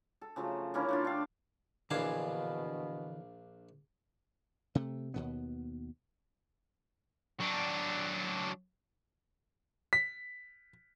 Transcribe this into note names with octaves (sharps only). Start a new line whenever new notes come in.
A4
C#3 F3 F#3 A3
D3 A#3 C#4 E4
A3 D4 F4
D4 G4 F5
A#1 B2 D3 E3 D4 F5 G#5 A5
C3 A3
D#2 B2 B3
F#3 D4
B6